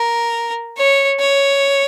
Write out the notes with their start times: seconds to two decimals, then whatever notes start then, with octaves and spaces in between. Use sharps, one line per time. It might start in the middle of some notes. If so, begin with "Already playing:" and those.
Already playing: A#4
0.78 C#5
1.20 C#5